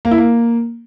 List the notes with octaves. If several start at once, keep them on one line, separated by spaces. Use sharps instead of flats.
A#3
E4
A#3